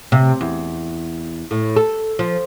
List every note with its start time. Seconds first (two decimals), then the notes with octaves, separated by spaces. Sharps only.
0.12 C3
0.41 E2
1.51 A2
1.76 A4
2.19 F3